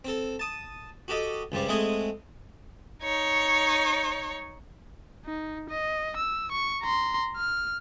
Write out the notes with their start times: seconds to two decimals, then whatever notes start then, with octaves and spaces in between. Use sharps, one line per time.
0.05 C4 A4
0.39 A5 D#6
1.08 F#4 G4 A4 D#5
1.52 C#2 G2 G3 C5
1.68 G#3 A3 C4 G#4 D#5 F#5
3.03 D#4 C#5
5.25 D#4
5.70 D#5
6.17 E6
6.52 C#6
6.82 A#5 C6
7.37 F6